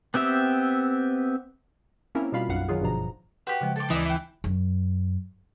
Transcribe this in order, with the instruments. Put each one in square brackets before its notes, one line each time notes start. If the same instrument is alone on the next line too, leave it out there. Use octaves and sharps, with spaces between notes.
[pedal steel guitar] B3 C4 G4 E5
[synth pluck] A#3 C4 C#4 E4 A#4
B2 G3 F4 F5 B5
B1 F#2 F5 F#5
D#3 F#3 F4 G#4
G1 G2 B2 F3 A#5
[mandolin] F#4 G4 [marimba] B4 C6 G6
[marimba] C#3 F3 G#3
[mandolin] A4 G5 D6
[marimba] D2 [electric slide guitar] E3 [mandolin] D#4 D5
[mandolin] E4 G5
[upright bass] F#2